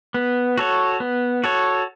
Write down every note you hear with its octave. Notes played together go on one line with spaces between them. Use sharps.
B3
F#4 A4 C#5
B3
F#4 A4 C#5